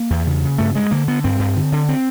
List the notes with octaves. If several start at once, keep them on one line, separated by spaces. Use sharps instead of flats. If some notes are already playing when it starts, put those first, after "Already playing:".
Already playing: A#3
E2
C#3
C#3
G2 A3
G2 G#3
D3 A#3
D3 B3
G2 C4
G2
D3
D3
C4